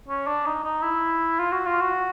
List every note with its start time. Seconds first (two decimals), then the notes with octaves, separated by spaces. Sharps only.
0.08 C#4
0.27 D4
0.46 D#4
0.64 D#4
0.82 E4
1.39 F4
1.52 F#4
1.66 F4
1.81 F#4